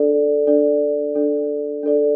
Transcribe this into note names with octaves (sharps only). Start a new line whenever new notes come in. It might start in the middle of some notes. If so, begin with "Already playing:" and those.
Already playing: D4 A4 D5
D4 A4 D5
D4 A4 D5
D4 A4 D5